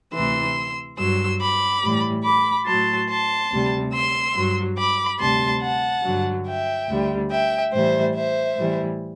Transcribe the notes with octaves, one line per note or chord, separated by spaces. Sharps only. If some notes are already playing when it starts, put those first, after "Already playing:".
D2 C3 E3 C6 E6
G2 F#3 C6 E6
B5 D6
A2 E3 G3
B5 D6
A2 F#3 A5 C6
A5 C6
D2 C3 G3
C6 E6
G2 F#3
B5 D6
D2 C3 G3 A5 C6
F#5 A5
G2 D3 F#3
E5 G5
D2 D3 G3
E5 G5
A2 E3 G3 C5 E5
C5 E5
A2 E3 G3